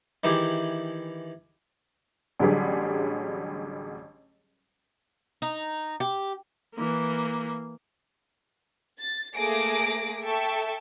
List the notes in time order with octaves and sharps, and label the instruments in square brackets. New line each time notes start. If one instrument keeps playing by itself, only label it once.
[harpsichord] D#3 E3 E4 G4 G#4
[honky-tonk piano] A1 D3 F#3 G3 G4 G#4
[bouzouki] D#4
G4
[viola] E3 A#3
[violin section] A6
A3 A#3 G#4 D6 A#6 D7
A4 E5 G5 A5 C#6